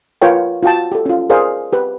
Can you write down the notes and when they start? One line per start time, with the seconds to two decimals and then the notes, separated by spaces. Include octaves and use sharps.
0.22 F4 A#4 B4 C#5 G5
0.63 F4 F#4 G5 A5
0.92 G4 A4
1.06 C#4 F4
1.30 G#4 A#4 C5 D5 F5
1.73 G4 B4